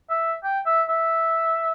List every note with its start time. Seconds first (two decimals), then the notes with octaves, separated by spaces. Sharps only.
0.10 E5
0.44 G5
0.66 E5
0.89 E5